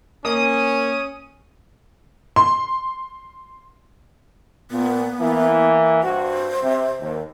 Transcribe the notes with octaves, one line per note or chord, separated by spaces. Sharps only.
A#3 C#4 D#6
C6
A#2 B3
E3 A#3 E4
G2 F#4 C5
C3
D#2